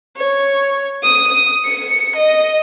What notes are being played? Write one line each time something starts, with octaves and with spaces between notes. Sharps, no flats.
C#5
D#6
C#7
D#5